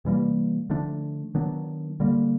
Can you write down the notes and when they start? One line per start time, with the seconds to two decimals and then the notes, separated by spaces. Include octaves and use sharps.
0.05 C3 E3 G3 A#3
0.70 D3 F3 A3 D4
1.35 D#3 F#3 B3 D4
2.00 D3 G3 A#3